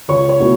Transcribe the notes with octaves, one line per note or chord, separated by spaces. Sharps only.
C#2 C#5
C#5
B2 F#3 A3 E4